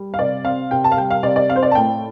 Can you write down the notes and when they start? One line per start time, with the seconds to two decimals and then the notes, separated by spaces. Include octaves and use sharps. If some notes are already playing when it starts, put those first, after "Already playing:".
Already playing: G3
0.14 F5
0.19 C3 D5
0.44 C4 F5
0.71 C3 G5
0.84 A5
0.92 F5
0.97 G3 G5
1.11 F5
1.23 C3 D5
1.36 D5
1.50 C4 F5
1.56 C5
1.63 D5
1.71 A5
1.75 A2 G5